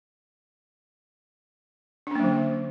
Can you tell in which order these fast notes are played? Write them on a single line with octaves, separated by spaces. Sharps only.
D4 C#4 A#3 F#3 D3